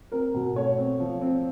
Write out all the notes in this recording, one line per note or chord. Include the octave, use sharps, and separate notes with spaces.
C4 A#4
B2
A3 C#5
C4
F3
C4